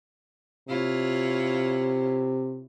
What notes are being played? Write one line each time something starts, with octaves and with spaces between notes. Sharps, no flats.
C3 E4 F4 C#5